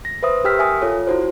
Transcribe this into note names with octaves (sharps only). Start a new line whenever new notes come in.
A#6
B4 C5 E5 D#6
G4 A#4 G5 E6 F6 B6
E5 G#5 D#6
F4 A4 C#5
E4 F#4 C5